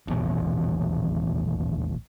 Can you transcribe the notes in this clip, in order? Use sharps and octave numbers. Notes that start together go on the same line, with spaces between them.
D#1 A1 E2 B2